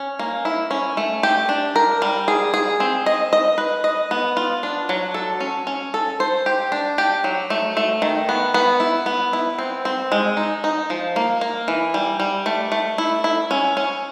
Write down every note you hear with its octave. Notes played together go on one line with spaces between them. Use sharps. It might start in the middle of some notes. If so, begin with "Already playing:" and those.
Already playing: C#4
A#3
E4
C#4
A3
G4
D4
A#4
G3
G#4
G#4
C4
D#5
D#5
B4
D#5
B3
F4
D4
F#3
A4
C#4
C#4
A4
C5
G4
D4
G4
F#3
A3
A3
D#3
B3
B3
E4
B3
E4
C4
C4
G#3
D#4
D#4
F3
A#3
A#3
E3
G3
G3
A3
A3
E4
E4
C#4
C#4